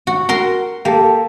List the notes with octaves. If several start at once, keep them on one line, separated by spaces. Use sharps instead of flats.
F#4
F#4 A#4 C6
A#3 G4 A4